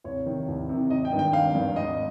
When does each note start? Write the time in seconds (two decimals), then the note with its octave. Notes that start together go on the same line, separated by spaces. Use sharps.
0.04 C2 C#5
0.26 C3 D#3
0.48 C2
0.69 C3 D#3
0.90 G#1 D#5
1.05 G5
1.12 G2 D#3
1.19 G5
1.33 G#1 F5
1.55 G2 D#3
1.76 G#1 D#5